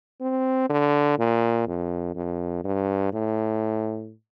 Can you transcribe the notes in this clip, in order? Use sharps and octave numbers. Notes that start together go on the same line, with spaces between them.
C4
D3
A#2
F2
F2
G2
A2